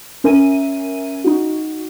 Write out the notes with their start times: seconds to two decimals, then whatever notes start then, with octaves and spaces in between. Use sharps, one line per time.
0.24 C#4 A#4 E5 G#5 D#7
1.24 D#4 F#4